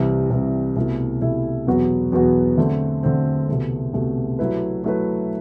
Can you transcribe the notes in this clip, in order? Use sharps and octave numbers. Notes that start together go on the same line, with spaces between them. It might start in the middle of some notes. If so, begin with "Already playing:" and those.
Already playing: C2 C3 E3 G3
C2 C3 E3 G3
C2 B2 A3 E4
C2 B2 A3 E4
E2 B2 F#3 B3 F#4
E2 B2 F#3 B3 F#4
D3 A3 C4
D3 A3 C4
C2 B2 A3
C2 B2 A3
F#3 A3 E4 B4
F#3 A3 E4 B4